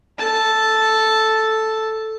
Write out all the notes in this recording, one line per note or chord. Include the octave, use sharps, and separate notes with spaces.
A4 A5